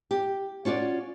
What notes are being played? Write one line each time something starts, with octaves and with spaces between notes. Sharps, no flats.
G4
C#4 F4 F#4 D5